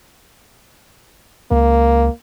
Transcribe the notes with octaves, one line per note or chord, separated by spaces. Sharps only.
C#2 A#3